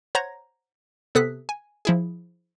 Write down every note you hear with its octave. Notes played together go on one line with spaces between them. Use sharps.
C5 C#5 F#5 A#5 G#6 A#6
C3 B3 A4 D#6 F#6 B6
G#5
F3 E4 G#4